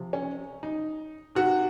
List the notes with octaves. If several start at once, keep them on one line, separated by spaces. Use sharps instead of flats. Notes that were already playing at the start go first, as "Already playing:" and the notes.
Already playing: C3 F3
C#4
D#4
C3 D#3 F#4